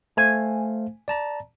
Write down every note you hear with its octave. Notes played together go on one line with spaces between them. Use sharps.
A3 C5 F5 G#5
D5 A5 A#5